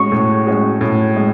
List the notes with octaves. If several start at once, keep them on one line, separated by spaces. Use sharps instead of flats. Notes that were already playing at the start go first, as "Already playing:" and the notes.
Already playing: A2 G#3 C#4 F#4 C#6
A2
G#3 C#4 F#4
A2
G#3